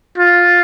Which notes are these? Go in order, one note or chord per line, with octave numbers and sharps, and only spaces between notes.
F4